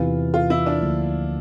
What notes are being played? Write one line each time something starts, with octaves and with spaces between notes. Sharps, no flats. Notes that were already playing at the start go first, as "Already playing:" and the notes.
Already playing: E2 C3 E3 F4
F4
E4
D4
D2 D3 F3 A#3